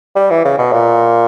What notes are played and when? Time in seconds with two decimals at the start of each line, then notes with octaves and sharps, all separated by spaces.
0.16 G3
0.30 E3
0.45 C#3
0.58 B2
0.73 A#2